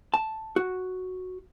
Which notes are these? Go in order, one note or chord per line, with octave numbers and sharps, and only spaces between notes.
A5
F#4